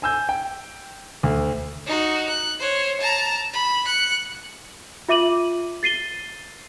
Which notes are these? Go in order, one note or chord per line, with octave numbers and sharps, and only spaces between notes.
G#5 E6 G6
G5
D2
D#4 F#4
F#6
C5 C#5
A5 A#5
B5
F#6 C#7
F4 E5 D6 D#7 F#7
A6 C7 D#7 G7